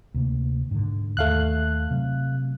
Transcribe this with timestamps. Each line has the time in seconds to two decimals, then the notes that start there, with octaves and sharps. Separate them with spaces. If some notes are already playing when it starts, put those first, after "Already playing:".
0.14 D2 C3 A#3
0.71 G#2 D3
1.17 D#2 A3 F5 F#6
1.91 C3 F#3